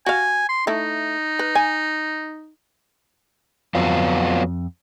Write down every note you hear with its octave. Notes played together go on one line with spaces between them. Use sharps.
F#4 F5 G#5
C6
A3 D#4 E4
B4
G#5
F2 F#3 B3 F4